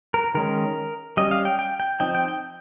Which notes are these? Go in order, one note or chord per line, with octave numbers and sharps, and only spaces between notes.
A#4
D#3 G#3 C#4 A#4
G3 C#4 D#5
F5
G5
G5
G5
F3 C4 D#4 G5
G5
G5